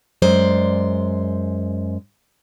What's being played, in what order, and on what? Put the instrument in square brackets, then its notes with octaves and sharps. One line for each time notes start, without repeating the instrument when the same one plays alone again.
[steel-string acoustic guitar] F#2 G#3 C5 D5